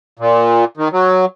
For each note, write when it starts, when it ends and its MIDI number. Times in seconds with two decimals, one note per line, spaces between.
0.19 0.65 46
0.77 0.89 51
0.93 1.25 54